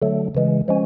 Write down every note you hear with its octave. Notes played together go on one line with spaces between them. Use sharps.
D3 F#3 A3
C#3 E3 G#3
F3 G#3 C#4